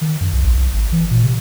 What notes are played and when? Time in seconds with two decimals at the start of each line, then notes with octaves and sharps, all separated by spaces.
0.01 D#3
0.21 F#2
0.33 C2
0.44 A#1
0.57 B1
0.73 G#1
0.92 E3
1.11 A#2
1.23 C3